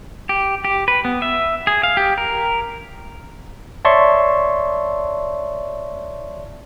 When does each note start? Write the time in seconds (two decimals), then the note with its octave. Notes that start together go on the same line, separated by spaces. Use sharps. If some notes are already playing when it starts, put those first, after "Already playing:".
0.29 G4
0.65 G4
0.88 B4
1.05 B3
1.22 E5
1.67 G#4
1.83 F5
1.97 G4
2.18 A#4
3.85 C#5 D5 E5 A5 C6 C#6